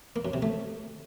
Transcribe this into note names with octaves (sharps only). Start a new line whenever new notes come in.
A#3
F#2
C3
A3